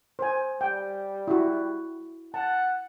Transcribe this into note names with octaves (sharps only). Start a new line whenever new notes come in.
C5 G#5
G3 G5
E4 F#4
F#5 A5